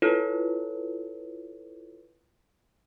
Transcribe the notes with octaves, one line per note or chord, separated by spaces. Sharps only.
E4 F4 A4 B4 C#5